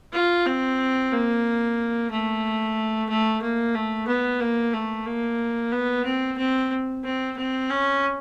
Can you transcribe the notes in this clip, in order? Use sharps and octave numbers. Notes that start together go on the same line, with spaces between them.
F4
C4
A#3
A3
A3
A#3
A3
B3
A#3
A3
A#3
B3
C4
C4
C4
C4
C#4